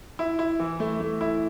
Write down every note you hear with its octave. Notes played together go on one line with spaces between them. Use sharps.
E4
E4
E3
A3
A3
E4